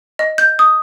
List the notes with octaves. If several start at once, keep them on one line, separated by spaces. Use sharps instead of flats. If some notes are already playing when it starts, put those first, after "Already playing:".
D#5
G6
D#6